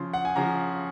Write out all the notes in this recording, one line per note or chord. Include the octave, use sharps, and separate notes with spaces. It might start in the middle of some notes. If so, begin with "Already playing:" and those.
Already playing: C#3 F3 C6
F#5
G#5
C#3 F3 A#5